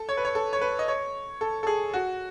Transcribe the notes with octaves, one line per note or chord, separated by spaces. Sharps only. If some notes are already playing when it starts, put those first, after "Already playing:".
Already playing: A4
C#5
B4
C#5
A4
C#5
B4
D#5
C#5
A4
A4
G#4
F#4